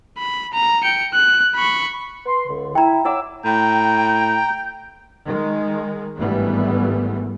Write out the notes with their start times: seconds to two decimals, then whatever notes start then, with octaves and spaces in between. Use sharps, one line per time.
0.18 B5
0.53 A#5
0.83 G5 C#7
1.14 F#6
1.55 B5 C#6
2.26 B4 C6
2.48 C#2 D3
2.75 E4 G5 A#5
3.05 E4 C#5 F#5 D6 E6
3.44 A2 G5 A#5
5.24 D#3 G#3
6.17 G#1 G2 E3 G3 A3 B3